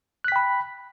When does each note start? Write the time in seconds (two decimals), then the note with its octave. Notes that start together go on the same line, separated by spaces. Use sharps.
0.24 F#6
0.28 B6
0.32 G5
0.36 B5